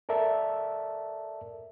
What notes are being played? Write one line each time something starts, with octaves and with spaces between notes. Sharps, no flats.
A4 A#4 D5 E5 A5